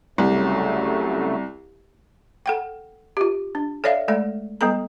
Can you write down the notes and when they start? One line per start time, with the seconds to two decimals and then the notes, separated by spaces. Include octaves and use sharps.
0.18 C2 C#3 F#3 A3
2.46 A4 F#5 G5
3.17 F4 G4
3.55 D4
3.84 A4 C#5 D5 E5 F5
4.08 G#3 A3 A4 D5
4.61 G3 B3 A4 A#5